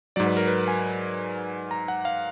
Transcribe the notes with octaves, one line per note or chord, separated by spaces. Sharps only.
G#2 F#3 D5
B4
A#4
B4
G#5
A#5
F#5
F5